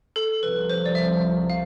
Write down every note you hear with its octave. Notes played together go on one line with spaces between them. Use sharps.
A4
C2 C3 F3 B4
C5
D5
E5
F5